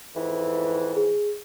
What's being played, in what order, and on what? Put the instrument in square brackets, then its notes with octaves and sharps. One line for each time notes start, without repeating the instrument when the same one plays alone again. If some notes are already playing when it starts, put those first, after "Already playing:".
[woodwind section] F2 G#2 E3
[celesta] G#4